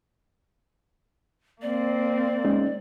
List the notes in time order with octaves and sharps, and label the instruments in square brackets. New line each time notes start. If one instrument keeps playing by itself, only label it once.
[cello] A#3 C4 [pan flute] D5
[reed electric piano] G#3 C#4 D#4